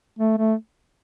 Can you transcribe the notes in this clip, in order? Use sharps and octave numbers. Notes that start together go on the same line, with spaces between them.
A3
A3